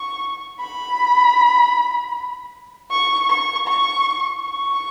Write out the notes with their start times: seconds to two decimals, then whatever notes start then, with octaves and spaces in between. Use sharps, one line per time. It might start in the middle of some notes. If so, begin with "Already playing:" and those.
Already playing: C#6
0.60 B5
2.90 C#6
3.29 C#6
3.67 C#6
4.44 C#6